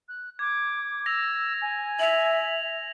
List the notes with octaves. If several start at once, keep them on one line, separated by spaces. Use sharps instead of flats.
F#6
D6 G#6
E6 A#6 F7
G#5
E5 F7 F#7